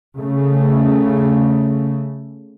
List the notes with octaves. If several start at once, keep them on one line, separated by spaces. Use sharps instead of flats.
C#3 A3